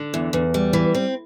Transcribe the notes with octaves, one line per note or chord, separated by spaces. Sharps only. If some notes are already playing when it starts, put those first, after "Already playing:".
Already playing: D3
E2
E2
G3
E3
C4